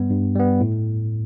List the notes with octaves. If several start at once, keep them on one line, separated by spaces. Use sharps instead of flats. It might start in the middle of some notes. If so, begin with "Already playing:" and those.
Already playing: G2 G3 B3
G2
G3 B3
A2